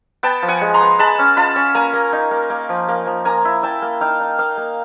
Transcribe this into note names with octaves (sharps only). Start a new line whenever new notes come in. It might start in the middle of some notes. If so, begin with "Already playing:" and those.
B3 G5 A5
F3
F#5 G#5
G#3
A#5 C6
B3
G#3 A5 B5
C#4
F4 A5 B5
C#4
A#3 G#5 A#5
A#3
D#4
A#3
A#3
F3
A#3
F3
A#3 G#5 A#5
E4
E4 G5 A5
A#3
D#4 F5 G5
D#4
A#3 D#5 F5
A#3